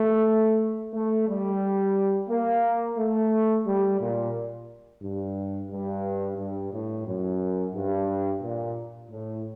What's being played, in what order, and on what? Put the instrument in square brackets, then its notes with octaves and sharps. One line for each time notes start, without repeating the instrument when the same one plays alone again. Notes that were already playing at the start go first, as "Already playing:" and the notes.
Already playing: [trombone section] A3
A3
G3
A#3
A3
G3
A#2
G2
G2
G2
A2
F#2
G2
A#2
A2